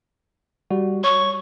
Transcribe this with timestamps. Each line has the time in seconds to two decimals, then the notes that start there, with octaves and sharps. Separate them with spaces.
0.71 G3 F#4
1.04 C#5 C#6